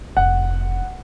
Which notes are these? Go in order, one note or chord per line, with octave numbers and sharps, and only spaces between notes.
F1 F#5